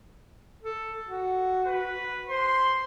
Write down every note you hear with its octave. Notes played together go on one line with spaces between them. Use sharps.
A4
F#4
B4
C5 C6